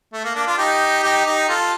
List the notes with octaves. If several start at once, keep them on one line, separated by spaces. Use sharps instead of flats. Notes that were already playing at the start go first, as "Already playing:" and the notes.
A3
A#3
A#3 D4
D4 F4
D#4 G4
D#4 G4
D#4 G4
F4 A4